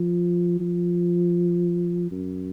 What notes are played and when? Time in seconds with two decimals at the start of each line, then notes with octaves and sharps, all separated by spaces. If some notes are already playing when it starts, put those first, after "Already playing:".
Already playing: F3
0.60 F3
2.11 F#2